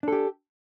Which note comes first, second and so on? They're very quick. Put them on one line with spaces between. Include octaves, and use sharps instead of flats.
D4 A4 G4